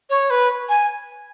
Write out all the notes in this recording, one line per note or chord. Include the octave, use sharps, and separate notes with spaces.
C#5
B4
G#5